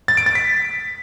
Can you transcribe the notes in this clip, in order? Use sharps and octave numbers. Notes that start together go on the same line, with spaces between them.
A6
D7
A6
B6